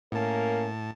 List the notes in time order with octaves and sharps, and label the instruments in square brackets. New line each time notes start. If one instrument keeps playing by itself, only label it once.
[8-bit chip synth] A2 A5 [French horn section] A#3 C#4 A#4